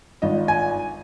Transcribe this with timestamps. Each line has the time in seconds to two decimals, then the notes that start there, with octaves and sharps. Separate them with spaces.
0.22 G#1 F4 D#5
0.48 G#5